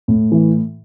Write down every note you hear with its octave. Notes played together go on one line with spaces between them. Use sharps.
A2
E3